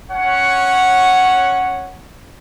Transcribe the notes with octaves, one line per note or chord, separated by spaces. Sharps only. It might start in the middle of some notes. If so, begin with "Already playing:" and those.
C#4 C#5 F#5